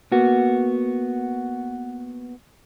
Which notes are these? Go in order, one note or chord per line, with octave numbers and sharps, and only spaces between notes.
A#3 B3 F#4